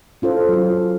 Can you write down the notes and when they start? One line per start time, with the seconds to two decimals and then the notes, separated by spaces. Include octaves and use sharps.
0.22 C#4 F4 A4 C5
0.49 F#3 F4